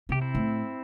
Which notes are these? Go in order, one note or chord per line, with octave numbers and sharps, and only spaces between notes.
C3 G4
C4 E4
A2